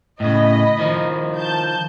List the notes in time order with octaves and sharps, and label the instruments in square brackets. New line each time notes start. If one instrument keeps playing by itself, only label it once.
[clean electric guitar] A2 C#3 [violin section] D#5 B5
[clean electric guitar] D#3 F3
[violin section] A5 G6